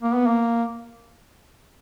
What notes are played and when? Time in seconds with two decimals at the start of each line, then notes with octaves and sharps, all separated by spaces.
0.02 A#3
0.15 B3
0.27 A#3